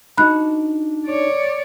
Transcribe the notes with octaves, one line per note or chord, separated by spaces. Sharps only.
D4 D#4 F#4 B5 F#6
C#5 D5